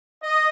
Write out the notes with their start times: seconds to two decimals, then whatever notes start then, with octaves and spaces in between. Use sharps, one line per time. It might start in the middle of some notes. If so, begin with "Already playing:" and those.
0.23 D#5